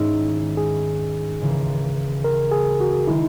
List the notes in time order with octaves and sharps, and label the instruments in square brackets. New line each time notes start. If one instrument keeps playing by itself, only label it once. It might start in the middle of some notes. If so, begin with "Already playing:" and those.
Already playing: [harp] G#2 D#3 G#3 C#4 E4 [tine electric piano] G#4
[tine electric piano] G#4
[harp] C#2 C#3 E3 A#3
[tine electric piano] A#4
G#4
F#4
[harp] D#3 G#3 D#4 [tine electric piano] E4